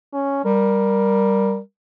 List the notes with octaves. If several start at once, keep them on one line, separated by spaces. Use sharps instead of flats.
C#4
G3 A#4